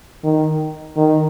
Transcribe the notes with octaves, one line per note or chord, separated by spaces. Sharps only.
D#3
D#3